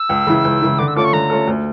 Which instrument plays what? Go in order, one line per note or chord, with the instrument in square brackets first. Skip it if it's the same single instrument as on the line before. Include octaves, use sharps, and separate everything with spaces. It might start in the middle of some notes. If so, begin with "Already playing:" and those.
Already playing: [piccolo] E6
[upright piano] C#2
C#3 E3
C#2
C#3 E3
[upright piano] D3 [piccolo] D6
[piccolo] E6
[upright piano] A3 C#4 F4 A4 [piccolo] D6
[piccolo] C#6
[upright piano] D3 [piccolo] A#5
[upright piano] A3 C#4 F4 A4
D2